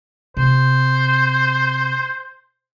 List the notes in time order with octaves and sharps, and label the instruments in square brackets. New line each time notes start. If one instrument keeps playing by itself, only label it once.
[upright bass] C3 [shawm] C5